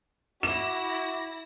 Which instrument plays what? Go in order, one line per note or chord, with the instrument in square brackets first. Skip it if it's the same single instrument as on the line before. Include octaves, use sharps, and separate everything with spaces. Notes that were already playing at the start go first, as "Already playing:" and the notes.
[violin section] E4 A#6 [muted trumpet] F#4 [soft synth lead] D6 [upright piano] E7